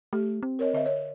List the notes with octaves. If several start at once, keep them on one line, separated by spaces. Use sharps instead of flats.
A3 G4
C4
A#4 C#5 D#5
D3 D#5 E5
C#5